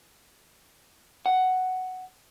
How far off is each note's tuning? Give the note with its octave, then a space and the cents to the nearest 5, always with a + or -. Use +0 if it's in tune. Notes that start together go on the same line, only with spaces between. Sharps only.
F#5 +5